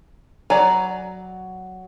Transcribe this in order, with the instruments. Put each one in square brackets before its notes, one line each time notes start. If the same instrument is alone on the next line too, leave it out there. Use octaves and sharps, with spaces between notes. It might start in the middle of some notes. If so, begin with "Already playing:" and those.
[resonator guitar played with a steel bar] F#3 A#5 [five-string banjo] D5 G#5